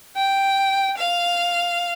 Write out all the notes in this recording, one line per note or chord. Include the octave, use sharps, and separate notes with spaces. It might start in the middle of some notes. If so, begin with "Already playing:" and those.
G5
F5